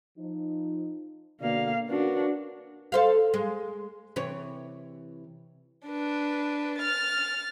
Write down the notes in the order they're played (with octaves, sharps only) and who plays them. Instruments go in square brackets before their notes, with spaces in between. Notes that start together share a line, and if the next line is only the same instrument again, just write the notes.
[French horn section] F3 D#4
[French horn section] B2 D3 D5 [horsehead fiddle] A#3 F5
[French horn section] C#4 A#4 B4 [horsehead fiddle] D4 F#4
[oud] A4 C5 F5
G#3
C3 E3 C#5
[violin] D4 B4
F6 A6